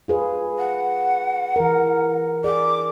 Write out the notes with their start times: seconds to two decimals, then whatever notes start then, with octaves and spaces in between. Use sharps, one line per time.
0.08 F4 G#4 B4
0.58 F#5
1.56 E3 A#4
2.44 G#4 D5 D6